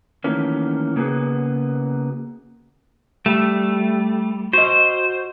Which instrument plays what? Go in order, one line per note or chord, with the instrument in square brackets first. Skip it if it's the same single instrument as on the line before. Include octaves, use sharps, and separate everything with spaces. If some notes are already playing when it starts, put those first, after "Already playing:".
[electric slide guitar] D#3 E3 F#3 A3 A#3 C#4
C#3 A#3 B3 F#4 G#4
[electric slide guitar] G3 [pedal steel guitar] A3
[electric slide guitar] F#4 D#5 [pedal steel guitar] C5